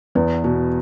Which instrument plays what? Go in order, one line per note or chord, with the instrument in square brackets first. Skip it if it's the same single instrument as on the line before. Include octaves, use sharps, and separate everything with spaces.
[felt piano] E2 B3
B2